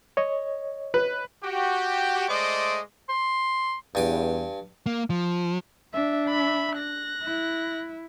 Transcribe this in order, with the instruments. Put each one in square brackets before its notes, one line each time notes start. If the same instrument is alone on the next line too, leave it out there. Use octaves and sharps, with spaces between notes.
[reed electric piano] C#5 D#5
[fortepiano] B4
[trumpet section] F#4 G4
G#3 A3 C5 D5 D#5 D6
[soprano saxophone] C6
[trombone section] E2 [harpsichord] G2 G#5 D6
[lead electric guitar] A#3
F3
[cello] D4 [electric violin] E5
[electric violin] E5 B5
F#6 A#6
[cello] E4